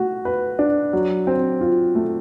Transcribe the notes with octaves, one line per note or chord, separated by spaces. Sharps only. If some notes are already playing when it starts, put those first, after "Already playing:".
Already playing: A3 F#4
B4
D4
F#3
C4
F4
A3